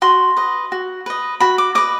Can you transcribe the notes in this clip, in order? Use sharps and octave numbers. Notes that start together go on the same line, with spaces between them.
F#4 C6
B4 D#5
F#4
B4 D#5
F#4 B5
D6
B4 D#5 D6